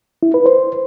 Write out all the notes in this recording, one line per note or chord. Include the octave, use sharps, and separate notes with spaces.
E4
B4
C5